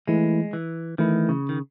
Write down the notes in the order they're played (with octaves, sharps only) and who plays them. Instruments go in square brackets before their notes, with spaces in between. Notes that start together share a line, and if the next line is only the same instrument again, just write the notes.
[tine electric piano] E3 A3 E4 [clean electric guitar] G#3
[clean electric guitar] E3
[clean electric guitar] D#3 [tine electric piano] E3 A3 E4
[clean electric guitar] C#3
D#3